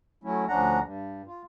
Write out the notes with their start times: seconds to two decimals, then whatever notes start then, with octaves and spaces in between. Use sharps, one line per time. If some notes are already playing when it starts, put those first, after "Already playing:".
0.24 F#3 A3 C#4 E4
0.48 D2 F3 C#4 D4 F#5 A#5
0.81 G2
1.27 F4